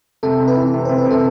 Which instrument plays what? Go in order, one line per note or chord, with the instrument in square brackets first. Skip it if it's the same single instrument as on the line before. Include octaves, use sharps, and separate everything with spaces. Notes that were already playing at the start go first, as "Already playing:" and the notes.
[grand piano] C3 [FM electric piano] A4
[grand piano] C3
[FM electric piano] B4
[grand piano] E3
C3
[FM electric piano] C5
[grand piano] C3
[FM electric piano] B4
[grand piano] C3 [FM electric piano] A4